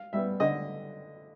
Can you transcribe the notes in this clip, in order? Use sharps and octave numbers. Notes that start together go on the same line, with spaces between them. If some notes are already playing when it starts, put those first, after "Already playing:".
Already playing: F5
G3 B3 E5
D3 D#5